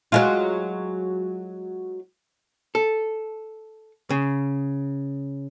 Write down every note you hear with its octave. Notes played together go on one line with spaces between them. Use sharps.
F#3 G#3 F4
A4
C#3